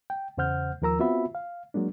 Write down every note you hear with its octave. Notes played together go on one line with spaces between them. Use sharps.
G5
E2 C#3 C5 F#5 F6 G6
D#2 F3 A#4 A#5 E6
B3 C4 F4 F#4 E5 B5
F5
F#3 G#3 A#3 D4